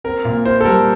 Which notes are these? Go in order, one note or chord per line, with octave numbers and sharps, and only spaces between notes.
C4 A#4
A#2
E4 C5
A4
G3 A#4